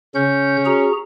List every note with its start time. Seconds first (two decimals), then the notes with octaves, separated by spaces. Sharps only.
0.15 C#3 C#4 G6
0.65 F#4 G#4 A#5